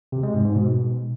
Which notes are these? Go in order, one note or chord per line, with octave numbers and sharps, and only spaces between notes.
C3
G#3
G#2
G#2
B2